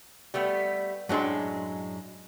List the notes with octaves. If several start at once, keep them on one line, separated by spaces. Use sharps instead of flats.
G3 A3 B3
F#2 A2 F#3 G#3 D4 C6